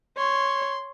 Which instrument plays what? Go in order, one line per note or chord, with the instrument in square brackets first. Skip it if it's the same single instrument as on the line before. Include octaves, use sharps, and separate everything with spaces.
[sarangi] C#5 [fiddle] C6